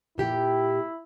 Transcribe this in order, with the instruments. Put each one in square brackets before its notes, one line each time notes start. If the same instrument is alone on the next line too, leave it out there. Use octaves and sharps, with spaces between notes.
[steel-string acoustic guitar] A#2 G4 G5 [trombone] E4